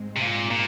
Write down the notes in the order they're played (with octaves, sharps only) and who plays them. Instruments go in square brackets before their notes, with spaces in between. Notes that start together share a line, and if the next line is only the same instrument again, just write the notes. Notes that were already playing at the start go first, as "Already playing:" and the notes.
Already playing: [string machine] G#2 G#3 C4
[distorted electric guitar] C3
A#2
A#2